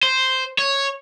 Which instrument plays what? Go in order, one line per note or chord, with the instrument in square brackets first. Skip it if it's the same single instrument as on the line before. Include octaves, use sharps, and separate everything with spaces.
[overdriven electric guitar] C5
C#5